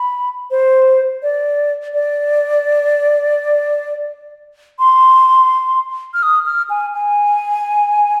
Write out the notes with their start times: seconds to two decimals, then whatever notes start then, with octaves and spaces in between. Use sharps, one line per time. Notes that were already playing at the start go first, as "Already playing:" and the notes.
Already playing: B5
0.51 C5
1.23 D5
1.94 D5
4.79 C6
6.14 F6
6.23 D#6
6.46 F6
6.70 G#5
6.94 G#5